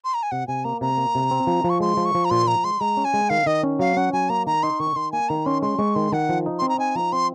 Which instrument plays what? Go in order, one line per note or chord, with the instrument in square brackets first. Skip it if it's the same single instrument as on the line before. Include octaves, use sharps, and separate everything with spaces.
[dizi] C6
A#5
G#5
[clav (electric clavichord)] C3 [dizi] F#5
[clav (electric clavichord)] C3 [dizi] G#5
[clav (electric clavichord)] A#3 [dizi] A#5
[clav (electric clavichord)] C3 [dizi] A#5
[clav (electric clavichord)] A#3
C3
C4
F3
F3
[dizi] C#6
[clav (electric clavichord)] G#3 [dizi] C6
[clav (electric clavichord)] F3
[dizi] C#6
[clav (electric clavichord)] F3
[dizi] A#5
[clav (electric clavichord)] A#2 [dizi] C6
[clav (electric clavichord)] F3 [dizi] A#5
[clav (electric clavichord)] G#3 [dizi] C6
[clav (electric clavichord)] G#3 [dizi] A#5
[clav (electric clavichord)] C#4
[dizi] G#5
[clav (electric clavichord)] G#3
[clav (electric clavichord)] D#3 [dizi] F5
[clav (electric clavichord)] D#3 [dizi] D#5
[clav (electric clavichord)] C#4
[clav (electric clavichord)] F#3 [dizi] F5
[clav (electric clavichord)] C#4 [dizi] F#5
[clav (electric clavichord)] F#3 [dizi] G#5
[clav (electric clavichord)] A#3 [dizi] A#5
[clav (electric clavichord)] D#3 [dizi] A#5
[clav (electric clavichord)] D#4 [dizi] C6
[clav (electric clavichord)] D#3 [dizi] C#6
[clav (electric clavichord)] D#3 [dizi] C6
[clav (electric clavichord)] A#3 [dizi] G#5
[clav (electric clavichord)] D#3 [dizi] A#5
[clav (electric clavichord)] C#4 [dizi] C6
[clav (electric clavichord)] G#3 [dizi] C6
[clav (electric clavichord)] G#3 [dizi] C#6
[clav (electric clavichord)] D#3 [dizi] C6
[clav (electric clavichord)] D#3 [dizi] F#5
[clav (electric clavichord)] F3
D#4
[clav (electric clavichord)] C4 [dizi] C6
[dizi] A#5
[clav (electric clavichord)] D#4 [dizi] G#5
[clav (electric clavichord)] F3 [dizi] A#5
[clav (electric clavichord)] C4 [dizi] C6